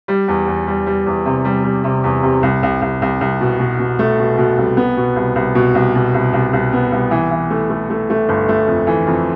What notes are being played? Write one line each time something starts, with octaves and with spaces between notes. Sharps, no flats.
G3
E2
E2
G3
G3
E2
C3
G3
G3
C3
E2
C3
C2
C2
C2
C2
C2
B2
B2
B2
A3
B2
B2
C2
B3
B2
C2
C2
B2
C2
B2
C2
C2
C2
B3
C2
E3
E3
A3
A3
A3
A3
G1
A3
F2
E3
F2